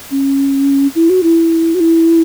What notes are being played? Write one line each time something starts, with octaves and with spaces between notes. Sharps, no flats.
C#4
E4
F#4
E4
F#4
E4